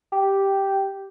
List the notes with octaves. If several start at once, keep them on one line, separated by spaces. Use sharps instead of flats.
G4